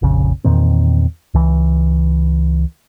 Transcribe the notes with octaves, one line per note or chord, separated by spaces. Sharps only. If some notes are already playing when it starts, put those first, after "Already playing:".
F1 A#1 C#3
E2 A#2 D#3 C4
C#2 E3